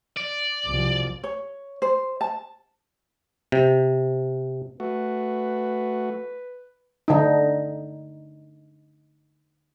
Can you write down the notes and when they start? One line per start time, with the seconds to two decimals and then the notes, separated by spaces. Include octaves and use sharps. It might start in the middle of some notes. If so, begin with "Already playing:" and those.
0.17 D5
0.67 C2 B2 F3
1.24 C#5
1.82 C5
2.21 A5
3.52 C3
4.80 A3 F#4 B4
7.08 D3 D#4